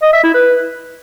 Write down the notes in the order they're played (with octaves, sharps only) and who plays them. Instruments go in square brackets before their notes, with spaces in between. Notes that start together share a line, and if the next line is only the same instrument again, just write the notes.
[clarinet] D#5
E5
E4
B4